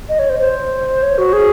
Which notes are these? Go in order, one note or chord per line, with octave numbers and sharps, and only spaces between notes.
D#5
C#5
C5
C5
C#5
F#4
G#4